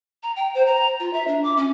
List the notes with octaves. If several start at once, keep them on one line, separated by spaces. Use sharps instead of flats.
A#5
G5
C5
A#5
F4
E5
D4
D6
C#4